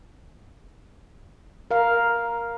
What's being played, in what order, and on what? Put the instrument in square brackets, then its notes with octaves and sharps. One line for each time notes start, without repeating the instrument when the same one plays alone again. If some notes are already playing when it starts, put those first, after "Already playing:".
[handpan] A#4 F5